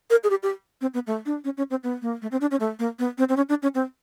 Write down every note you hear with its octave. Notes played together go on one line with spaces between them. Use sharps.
A#4
G#4
G4
G4
C4
B3
A3
D4
C#4
C#4
C4
B3
A#3
A3
C4
D4
C#4
A3
A#3
B3
C4
C4
C#4
D4
C#4
C4